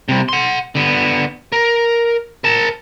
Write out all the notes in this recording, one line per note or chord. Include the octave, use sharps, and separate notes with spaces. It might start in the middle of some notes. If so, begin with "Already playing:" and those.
C3 G3
F#5 C6
D3 B3
A#4
A#4 A5